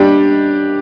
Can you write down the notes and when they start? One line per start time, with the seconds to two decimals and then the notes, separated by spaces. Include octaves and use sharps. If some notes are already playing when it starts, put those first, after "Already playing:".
Already playing: G3 D4 G4